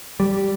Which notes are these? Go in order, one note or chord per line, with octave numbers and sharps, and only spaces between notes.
G3